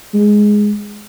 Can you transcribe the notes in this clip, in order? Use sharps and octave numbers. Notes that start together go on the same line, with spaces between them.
G#3